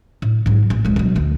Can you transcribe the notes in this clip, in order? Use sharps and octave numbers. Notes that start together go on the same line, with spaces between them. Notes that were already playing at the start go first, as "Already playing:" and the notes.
A2
G#2 F#3
A1
D1 G#3
B2 F#3
D2 D3